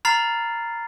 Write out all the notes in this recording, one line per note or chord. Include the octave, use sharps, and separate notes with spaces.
A#5 B5 F6 A6 C7